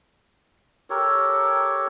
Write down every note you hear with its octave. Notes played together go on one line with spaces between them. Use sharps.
G4 A4 A#4 C#5